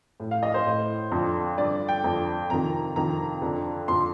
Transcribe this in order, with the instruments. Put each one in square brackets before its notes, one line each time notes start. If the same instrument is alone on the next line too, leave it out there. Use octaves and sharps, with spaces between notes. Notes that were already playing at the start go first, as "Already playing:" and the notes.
[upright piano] A2
F5
D#5
C5
A2
F2 D3
G2 D3 D5
G5
F2 D3
F2 C3 D#3 A#5
F2 C3 D#3 A#5
F2 D3
F2 D3 C6